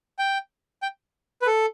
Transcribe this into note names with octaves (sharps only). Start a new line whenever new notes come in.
G5
G5
B4
A4